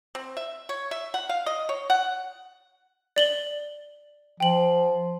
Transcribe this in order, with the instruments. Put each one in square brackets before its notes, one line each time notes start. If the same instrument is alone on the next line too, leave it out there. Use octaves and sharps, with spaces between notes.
[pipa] C4
E5
C#5
E5
F#5
F5
D#5
C#5
F#5
[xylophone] D5 F#7 G7
[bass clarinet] F3 [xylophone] G5 F#7